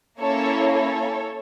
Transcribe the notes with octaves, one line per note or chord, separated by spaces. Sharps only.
A#3 C#4 E4 A4 C#5
A4 C#5